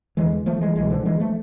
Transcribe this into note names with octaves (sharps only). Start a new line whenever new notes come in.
E2 D3 E3 G#3
F3 A3
E3 G#3
C2 B2 E3 G#3
D3 F3
E3 G#3
F3 A3